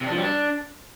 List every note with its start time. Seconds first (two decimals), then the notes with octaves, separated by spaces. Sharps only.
0.01 C3
0.06 D4
0.12 F3
0.17 G3
0.23 D4